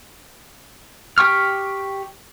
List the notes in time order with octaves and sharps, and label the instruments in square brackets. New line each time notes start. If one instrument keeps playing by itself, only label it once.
[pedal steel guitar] G4 G5 C#6 F6